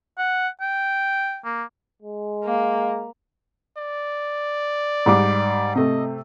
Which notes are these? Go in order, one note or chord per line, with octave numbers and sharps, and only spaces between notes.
F#5
G5
A#3
G#3
A#3
D5
G#2 G3 D6
C3 A3 D#5